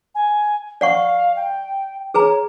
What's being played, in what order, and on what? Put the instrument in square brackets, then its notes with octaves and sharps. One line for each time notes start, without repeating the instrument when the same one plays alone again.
[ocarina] G#5
[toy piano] D5 F#5 C#6 [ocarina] F5
[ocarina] G5
[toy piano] G#4 B4 A#5 [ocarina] C#5